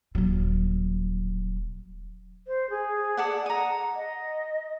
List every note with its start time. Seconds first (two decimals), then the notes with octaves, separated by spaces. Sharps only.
0.15 D#1 F#3
2.47 C5
2.70 G#4
3.17 A4 D5 F#5
3.46 F#5 A#5 D#6
3.96 D#5